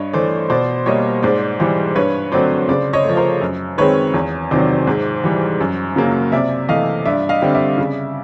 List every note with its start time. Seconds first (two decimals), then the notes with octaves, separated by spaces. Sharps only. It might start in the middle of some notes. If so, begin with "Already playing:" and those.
Already playing: G2 C#5 D#5
0.13 E3 A3 C5 D5
0.50 B2 C5 D5
0.86 G3 A#3 C#5 D#5
1.23 G#2 C5 D5
1.60 E3 G3 C5 D5
1.96 G2 B4 C#5
2.32 D3 F#3 A3 C4 C5 D5
2.69 C#3 C5 D5
2.93 C#5 D#5
3.05 F3 A3
3.17 A#4 C5
3.41 F#2
3.78 D#3 G#3 C4 B4 C#5
4.14 E2
4.51 C3 D#3 F#3 C5 D5
4.87 G#2
5.24 E3 G3
5.60 F#2
5.96 C#3 F#3 A#3
6.32 C3 D5 E5
6.69 E3 A3 D#5 F5
7.05 G2 D5 E5
7.29 D#5 F5
7.42 D3 G3 C4
7.55 D5 E5
7.78 C#3